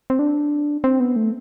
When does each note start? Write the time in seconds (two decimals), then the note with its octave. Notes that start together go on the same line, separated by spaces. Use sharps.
0.10 C4
0.19 D4
0.84 C4
1.00 B3
1.16 A3